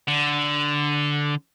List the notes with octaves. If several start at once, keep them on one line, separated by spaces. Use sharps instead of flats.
D3